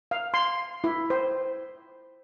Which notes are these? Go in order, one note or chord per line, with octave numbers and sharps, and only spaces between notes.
F5
C6
E4
C5